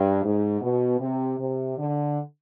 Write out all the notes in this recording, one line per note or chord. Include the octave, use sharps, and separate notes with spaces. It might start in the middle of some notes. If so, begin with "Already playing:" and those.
Already playing: G2
G#2
B2
C3
C3
D3